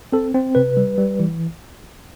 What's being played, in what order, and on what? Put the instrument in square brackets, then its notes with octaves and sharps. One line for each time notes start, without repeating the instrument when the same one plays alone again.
[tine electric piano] C4 A4
C4
C3 B4
G3
G3
E3